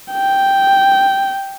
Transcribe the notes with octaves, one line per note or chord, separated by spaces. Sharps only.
G5